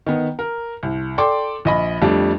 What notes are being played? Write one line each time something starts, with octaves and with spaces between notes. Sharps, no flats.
D#3 B3
A#4
C2
A4 D5 G5 C6 D6
A#1 D#5 B5
F2 G3 A3 D4